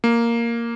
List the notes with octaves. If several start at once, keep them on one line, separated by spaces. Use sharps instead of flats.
A#3